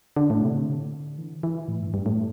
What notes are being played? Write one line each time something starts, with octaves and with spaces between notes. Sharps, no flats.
D3
A2
C3
D3
E3
E3
A2
G2
G2
A2